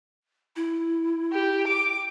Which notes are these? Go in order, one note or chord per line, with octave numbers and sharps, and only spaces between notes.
E4
G4
D6